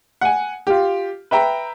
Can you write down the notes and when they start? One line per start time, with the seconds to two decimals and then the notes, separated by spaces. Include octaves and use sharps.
0.21 F#5 G#5
0.67 F4 G4
1.31 B4 E5 G5 A#5